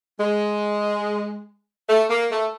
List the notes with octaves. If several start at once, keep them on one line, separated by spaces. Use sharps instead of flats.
G#3
A3
A#3
A3